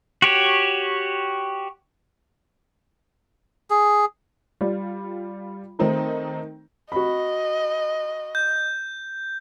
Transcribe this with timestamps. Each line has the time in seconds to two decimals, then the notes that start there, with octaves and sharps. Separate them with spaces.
0.22 F#4 G4 C#5
3.70 G#4
4.61 G3 F4 D5
5.79 D#3 A3 C4 D#4 A#4
6.92 F#4 D#5 B5
8.35 G6